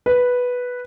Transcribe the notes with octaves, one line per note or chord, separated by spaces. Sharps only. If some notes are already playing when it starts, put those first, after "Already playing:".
B4